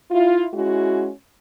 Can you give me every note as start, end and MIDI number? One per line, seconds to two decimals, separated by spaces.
0.11 0.46 64
0.11 0.46 65
0.54 1.09 56
0.54 1.09 61
0.54 1.09 64
0.54 1.09 66